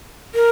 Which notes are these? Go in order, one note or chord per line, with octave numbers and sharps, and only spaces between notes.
A#4